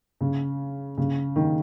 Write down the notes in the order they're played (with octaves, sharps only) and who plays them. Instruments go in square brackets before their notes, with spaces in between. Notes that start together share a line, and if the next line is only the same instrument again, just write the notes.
[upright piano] C#3
C#3
D#3